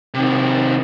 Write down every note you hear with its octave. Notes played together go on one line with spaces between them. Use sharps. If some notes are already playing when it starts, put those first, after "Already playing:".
C3 D#3